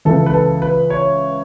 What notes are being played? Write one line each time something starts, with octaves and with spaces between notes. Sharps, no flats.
C#2 C#3 E3 A4
B4
A4
B4
C#5